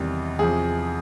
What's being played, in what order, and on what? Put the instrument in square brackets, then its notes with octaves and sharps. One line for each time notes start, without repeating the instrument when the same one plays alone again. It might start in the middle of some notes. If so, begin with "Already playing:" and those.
Already playing: [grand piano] E2 C3 D#3 G3
E2 C3 F3 G#4